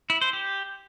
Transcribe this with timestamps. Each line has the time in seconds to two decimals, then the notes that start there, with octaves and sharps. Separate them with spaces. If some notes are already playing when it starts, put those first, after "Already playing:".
0.10 E4
0.21 C5
0.33 G4